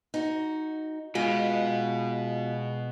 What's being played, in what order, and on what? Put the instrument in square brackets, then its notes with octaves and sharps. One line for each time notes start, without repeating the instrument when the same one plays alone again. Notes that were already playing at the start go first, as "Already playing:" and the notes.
[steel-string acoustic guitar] D#4 F#4
[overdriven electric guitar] B2 B3 [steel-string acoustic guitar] G#3 [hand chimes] F4 F#4 F5